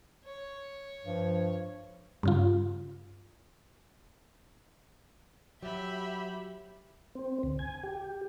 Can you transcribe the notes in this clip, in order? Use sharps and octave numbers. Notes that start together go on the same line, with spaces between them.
C#5
G2 F3
G2 C#3 F4
F#3 G4 E5 B5
C4
D2
G#5
G4